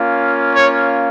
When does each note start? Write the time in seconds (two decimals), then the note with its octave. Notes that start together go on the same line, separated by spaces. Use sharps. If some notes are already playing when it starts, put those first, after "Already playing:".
Already playing: A#3 C#4 F4
0.53 C#5